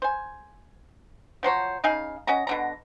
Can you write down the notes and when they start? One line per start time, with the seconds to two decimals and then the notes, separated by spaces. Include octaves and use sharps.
0.02 C5 G#5
1.43 F3 F#3 C5 C#5
1.84 C#3 D#4 G#4 F5
2.27 C#4 F#4 D#5 A#5
2.47 B2 D3 A#5